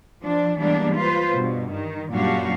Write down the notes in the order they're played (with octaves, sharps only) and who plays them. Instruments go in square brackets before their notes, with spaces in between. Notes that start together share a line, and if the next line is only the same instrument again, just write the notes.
[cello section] F3 D4
E3 G3 G#3 A#3 B3 D4
F4 B4 C5
G2 B2
D#3
F#2 A#2 G3 D4 F#4 F5